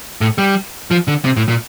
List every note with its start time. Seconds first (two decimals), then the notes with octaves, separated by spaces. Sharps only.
0.21 A2
0.38 G3
0.91 F3
1.08 D3
1.25 C3
1.37 A2
1.48 A#2